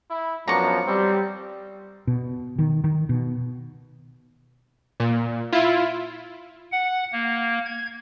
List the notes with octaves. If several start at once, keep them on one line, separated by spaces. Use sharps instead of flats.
E4
F#2 F3 B3 D4 A#5 C#6
G3 C4
B2
D#3
D#3
B2
A#2
E4 F4
F#5
A#3
G#6